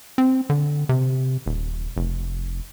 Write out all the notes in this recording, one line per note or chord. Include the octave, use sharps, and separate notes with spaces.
C4
D3
C3
D#1
F1